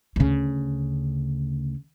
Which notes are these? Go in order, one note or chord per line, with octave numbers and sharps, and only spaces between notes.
D2 C#3